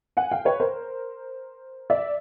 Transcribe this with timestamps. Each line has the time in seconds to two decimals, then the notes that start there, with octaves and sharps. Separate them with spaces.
0.17 F#5 G#5
0.31 F5 G5
0.45 B4 C#5
0.60 A#4 C5
1.90 D5 E5